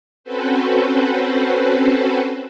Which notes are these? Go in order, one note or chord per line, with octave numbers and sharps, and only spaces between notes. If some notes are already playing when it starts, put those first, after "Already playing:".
C4 C#4 F#4 A4 B4 C5